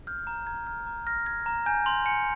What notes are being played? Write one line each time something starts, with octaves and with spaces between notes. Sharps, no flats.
F6 G6
A#5
A#5 G#6
F6
A#5
F6 A#6
F6 G#6
A#5
G#5 G6
C6 F7
G#5 C#7